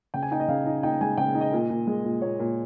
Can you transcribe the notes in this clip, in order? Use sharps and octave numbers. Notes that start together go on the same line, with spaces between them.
C#3 G5
G#5
D#4 G5
D#5
C#3 F5
D#4
D#4 G5
G#3 G#5
C#3 G5
D#4
D#5
A#2
A#2
G#3
A#2
A#2 C#5
A#2